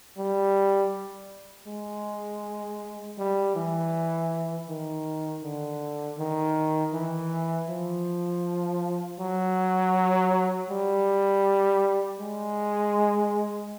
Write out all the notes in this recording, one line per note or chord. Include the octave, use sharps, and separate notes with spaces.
G3
G#3
G3
E3
D#3
D3
D#3
E3
F3
F#3
G3
G#3